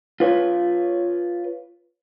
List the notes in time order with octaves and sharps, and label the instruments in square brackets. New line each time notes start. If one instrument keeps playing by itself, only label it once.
[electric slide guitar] F4 B4 C#5